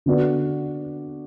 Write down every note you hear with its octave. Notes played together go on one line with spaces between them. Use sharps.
D3 B3 F#4 D5